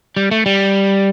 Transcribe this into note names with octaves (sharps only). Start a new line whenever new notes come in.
G3
A3
G3